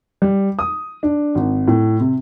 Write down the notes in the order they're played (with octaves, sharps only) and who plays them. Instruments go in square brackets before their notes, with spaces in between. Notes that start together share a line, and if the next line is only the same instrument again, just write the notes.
[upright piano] G3
D#6
D4
G#1
A2
C3